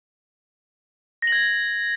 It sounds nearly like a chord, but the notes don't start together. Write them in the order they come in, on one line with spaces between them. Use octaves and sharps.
A#6 F#7 G#6